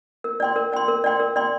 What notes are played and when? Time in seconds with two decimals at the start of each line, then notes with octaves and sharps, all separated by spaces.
0.24 A#4
0.40 D5 G5 C6
0.56 A#4
0.72 D5 G5 C6
0.88 A#4
1.04 D5 G5 C6
1.20 A#4
1.36 D5 G5 C6